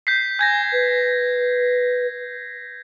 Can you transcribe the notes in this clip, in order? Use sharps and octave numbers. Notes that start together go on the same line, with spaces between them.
G6 B6 C7
G#5 G6 G#6 A#6
B4